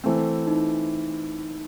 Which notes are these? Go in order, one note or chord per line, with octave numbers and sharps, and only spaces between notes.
E3 A3 C4
D#4